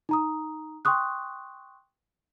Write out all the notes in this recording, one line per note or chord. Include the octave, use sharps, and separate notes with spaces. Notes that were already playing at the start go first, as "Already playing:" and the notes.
D#4 A#5 D#6
G5 C6 C#6 D#6 F#6